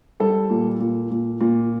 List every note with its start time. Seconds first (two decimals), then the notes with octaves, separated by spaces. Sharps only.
0.20 G3 A4
0.50 A#2
0.80 A#2
1.11 A#2
1.41 A#2